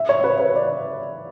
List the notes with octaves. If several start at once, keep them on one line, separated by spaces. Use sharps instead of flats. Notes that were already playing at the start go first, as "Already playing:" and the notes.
Already playing: E5
C#5
B4
B4
D5